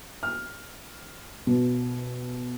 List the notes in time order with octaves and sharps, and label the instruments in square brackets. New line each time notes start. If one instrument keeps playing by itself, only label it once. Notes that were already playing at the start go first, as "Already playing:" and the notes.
[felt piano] F6
B2